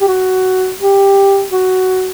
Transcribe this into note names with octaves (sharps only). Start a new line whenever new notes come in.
G4
F#4
G4
F#4